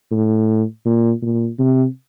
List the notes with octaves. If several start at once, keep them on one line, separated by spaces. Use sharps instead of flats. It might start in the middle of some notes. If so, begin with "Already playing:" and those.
A2
A#2
A#2
C3